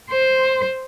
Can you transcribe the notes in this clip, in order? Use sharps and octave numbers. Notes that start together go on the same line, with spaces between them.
C5